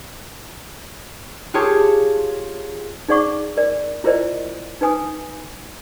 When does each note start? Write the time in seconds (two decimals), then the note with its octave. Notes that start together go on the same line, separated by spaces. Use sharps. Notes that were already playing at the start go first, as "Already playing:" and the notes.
1.54 F4 G4 G#4 C#5 A5
3.08 D#4 G#4 D5 F#5 C#6 D6
3.57 A#4 D5
4.04 E4 F4 A#4 C5 D5 D#5
4.81 D#4 B4 G#5 D#6